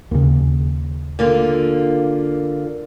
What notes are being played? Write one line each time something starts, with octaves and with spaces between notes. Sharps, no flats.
D#2 C#3
D3 A#3 F4